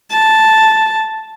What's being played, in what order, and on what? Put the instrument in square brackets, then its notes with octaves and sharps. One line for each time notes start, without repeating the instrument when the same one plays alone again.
[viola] A5